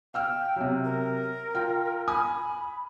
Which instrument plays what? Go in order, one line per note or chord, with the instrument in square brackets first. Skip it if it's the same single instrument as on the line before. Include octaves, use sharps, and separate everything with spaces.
[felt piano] F5 E6 F6 [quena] G5
[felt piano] C3 F#3
[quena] A#4
[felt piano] F4 G5
[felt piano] G#5 D#6 [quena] B5